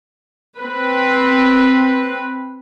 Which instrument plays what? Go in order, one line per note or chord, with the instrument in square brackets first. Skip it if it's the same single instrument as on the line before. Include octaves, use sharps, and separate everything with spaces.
[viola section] C4 B4